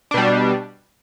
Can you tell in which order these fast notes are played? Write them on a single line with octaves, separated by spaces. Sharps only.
D4 B2 G3